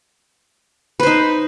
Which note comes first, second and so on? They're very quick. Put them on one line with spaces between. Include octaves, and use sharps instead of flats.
B4 C5 D#4